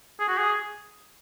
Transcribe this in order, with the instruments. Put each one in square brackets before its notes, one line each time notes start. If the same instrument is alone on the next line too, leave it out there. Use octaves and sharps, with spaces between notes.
[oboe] G#4
F#4
G#4